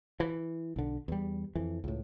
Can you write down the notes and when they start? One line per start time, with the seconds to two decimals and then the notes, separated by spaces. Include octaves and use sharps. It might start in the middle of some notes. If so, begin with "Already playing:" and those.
0.20 E3
0.76 B1 D3
1.08 E2 G3
1.55 F2 E3
1.84 C#2 A2